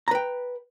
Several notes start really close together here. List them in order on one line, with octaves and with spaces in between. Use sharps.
A#5 B4 G5